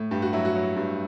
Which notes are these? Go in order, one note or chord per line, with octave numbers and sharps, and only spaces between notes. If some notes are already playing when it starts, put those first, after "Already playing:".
Already playing: A2
G2 G4
F#4
F#3 E4
F#4
F#3
G2